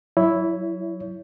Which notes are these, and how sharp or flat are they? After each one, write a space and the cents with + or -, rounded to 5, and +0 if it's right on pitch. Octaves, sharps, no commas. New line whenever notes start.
F#3 +0 E4 +0 C#5 +20